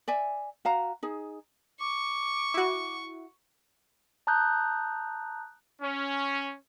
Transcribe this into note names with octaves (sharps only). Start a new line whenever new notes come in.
D5 E5 G#5
F#4 F5 A#5
D#4 G#4
C#6 D6
E4 F#4
A5 A#5 D#6 F#6 G6
C#4